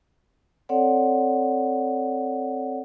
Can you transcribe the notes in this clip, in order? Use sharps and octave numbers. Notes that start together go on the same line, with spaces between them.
C4 A4 C#5 D5 F#5